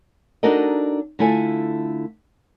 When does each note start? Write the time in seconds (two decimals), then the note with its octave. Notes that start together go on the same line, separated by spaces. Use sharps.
0.43 D4 D#4 F#4 A4 A#4 D#5
1.19 D3 A3 E4 F4 A4 G#5